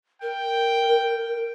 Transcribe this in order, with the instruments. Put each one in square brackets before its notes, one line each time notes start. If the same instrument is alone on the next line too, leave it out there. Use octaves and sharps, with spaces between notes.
[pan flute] A#4 [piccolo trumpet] G5